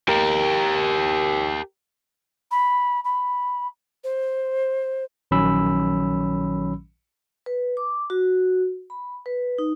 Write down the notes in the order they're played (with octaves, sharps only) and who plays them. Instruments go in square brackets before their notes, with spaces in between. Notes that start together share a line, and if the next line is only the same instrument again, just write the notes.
[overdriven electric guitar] G4 A#4
[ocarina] B5
B5
C5
[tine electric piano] A#1 D#3 F#3 C#4 B5 E6
[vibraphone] B4
D6
F#4
B5
B4
D#4